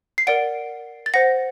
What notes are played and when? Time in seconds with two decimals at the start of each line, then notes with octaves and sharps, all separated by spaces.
0.18 C7
0.27 A#4 D5 F#5 D7
1.06 A6
1.14 C5 F#5 A#6